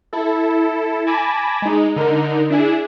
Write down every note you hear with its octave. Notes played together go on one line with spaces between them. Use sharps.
E4 A4
G#5 A5 B5 D6 G#6 A#6
G#3 D#4
D3 D#4 A#4
D4 E4 G#4